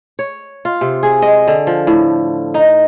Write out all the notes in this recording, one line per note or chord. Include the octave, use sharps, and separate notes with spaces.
C#5
F4
C3
G#4
D#5
D3
F3
A2
D#4